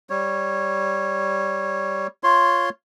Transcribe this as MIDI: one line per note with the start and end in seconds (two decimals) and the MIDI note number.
0.10 2.07 55
0.10 2.07 73
2.23 2.69 65
2.23 2.69 73
2.23 2.69 84